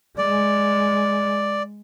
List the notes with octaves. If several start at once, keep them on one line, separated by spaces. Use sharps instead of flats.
G#3 D5